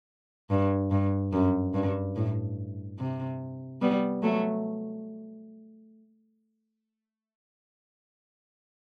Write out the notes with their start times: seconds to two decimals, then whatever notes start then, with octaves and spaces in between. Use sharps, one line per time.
0.50 G2
0.91 G2
1.33 F#2
1.74 G2
2.16 A2
2.99 C3
3.81 G3 B3
4.23 F#3 A3